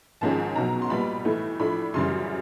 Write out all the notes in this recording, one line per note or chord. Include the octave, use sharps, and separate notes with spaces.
G#1 G#2 F3 G#3 C#4 A5
B1 B2 F#3 A#5
C6
B1 A#2 G3 B3 B5
A2 E3 A3
A2 F3 A3 D4 B5
F#2 C#3 E3 G3 C6